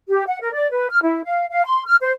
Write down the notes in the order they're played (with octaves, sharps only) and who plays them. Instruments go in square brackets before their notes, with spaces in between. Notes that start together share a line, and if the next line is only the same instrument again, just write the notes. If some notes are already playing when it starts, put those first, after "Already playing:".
[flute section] G4
F#5
A#4
D5
B4
F6
E4
F5
F5
C6
F6
C5